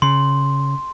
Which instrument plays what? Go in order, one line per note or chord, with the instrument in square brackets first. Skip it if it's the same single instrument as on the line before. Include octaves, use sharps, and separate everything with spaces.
[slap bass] C#3 [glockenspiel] C6